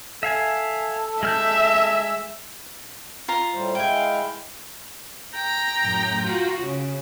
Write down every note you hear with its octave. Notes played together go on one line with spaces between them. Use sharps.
A4 E5 F5 G#5
G#3 E5 F6 G6
F4 A#5
A2 G3 C5
G#3 E4 F5 G5 G#5
G5 A#5
F#2 A2
F4 F#4
C#3